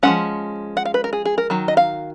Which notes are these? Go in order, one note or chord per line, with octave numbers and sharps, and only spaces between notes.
F3 G#3 C#4 F#5
F#5
F5
B4
A#4
G#4
G#4
A#4
D#3 F#3
D#5
F5